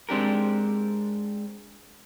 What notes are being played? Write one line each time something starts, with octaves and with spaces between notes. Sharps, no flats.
G#3 C4 D4 G4 A#4